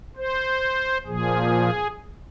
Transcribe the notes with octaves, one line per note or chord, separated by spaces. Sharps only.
C5
A#2 F3 G#4